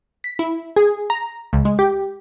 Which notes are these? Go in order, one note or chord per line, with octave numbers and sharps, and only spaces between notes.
B6
E4
G#4
A#5
C#2
G#3
G4